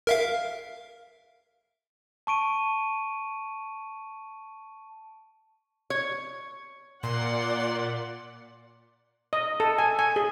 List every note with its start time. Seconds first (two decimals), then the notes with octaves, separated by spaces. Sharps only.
0.07 A#4 E5 F5
2.27 A5 C#6 D7 D#7
5.90 C#5
7.03 A#2 D5 F#5 C6
9.33 D#5
9.60 A4
9.78 G#5
9.99 G#5
10.16 G#4